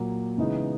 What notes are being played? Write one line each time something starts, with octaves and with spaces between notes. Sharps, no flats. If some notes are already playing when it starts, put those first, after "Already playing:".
Already playing: A#2 F#3 A#3
C#3 E3 G#3 B3 D#4